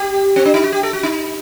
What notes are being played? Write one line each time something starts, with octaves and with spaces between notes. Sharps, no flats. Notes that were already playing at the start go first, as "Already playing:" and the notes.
Already playing: G4
C4
D4
D#4
F#4
G4
A4
F#4
D#4